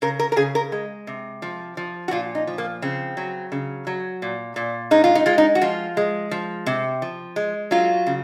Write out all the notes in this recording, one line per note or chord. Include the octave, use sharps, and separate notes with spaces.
C#3 A#4
A#4
A#4
C#3 G#4
A#4
G#3
C3
F3
F3
F#4
A#2 F4
D#4
F3
A#3
C#3 C4
F#3
C#3
F#3
A#2
A#2
G#3 D#4
F4
D#4
G#3 F4
D#4
F#4
F3 F4
G#3
F3
C3
F3
G#3
F#3 F4
C#3